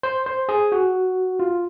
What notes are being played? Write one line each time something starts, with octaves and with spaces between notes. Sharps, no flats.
C5
C5
G#4
F#4
F4